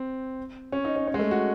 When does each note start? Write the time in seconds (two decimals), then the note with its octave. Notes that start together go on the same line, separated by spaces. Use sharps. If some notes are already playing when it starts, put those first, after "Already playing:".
Already playing: C4
0.72 C#4
0.85 D#4
0.96 C#4
1.07 C#4
1.14 G#3
1.19 A3
1.31 F#4